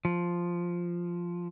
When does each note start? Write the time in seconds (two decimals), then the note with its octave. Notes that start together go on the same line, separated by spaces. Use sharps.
0.05 F3